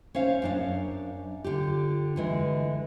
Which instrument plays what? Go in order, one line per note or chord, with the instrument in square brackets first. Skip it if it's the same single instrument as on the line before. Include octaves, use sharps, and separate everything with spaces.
[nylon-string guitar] C#4 C5 F5
F#2 D4 F5
D3 F4 G4
D3 E3 G#3